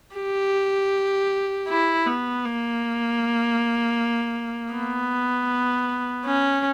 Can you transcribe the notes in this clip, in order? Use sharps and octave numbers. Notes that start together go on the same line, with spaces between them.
G4
E4
B3
A#3
B3
C#4